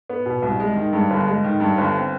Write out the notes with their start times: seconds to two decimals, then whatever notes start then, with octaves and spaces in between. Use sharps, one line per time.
0.10 B3
0.26 B2
0.42 C2
0.60 G#3
0.76 D#3
0.93 G2
1.10 G1
1.27 G#3
1.44 D#3
1.60 G2
1.78 G1
1.95 C4